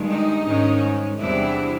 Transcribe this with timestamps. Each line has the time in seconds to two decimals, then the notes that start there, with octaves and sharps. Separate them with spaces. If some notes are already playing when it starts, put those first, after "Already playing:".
Already playing: G2 D#3 G#3
0.08 D#4
0.45 G#2 D#3 G#3 C#4
1.19 E2 C3 E3 G3 C4 D4 E4